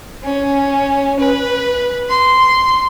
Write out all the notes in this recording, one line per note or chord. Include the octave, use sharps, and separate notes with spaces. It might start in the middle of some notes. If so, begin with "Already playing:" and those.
C#4
B4
C6